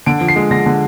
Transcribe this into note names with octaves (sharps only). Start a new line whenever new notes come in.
D3 D7
F3
C7
G#3
D3 A#6
D3